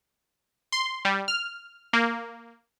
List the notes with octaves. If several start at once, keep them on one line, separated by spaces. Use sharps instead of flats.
C6
G3
F6
A#3